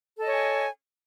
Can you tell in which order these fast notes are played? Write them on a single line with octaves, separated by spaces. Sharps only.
A4 D#5 C#5 G#5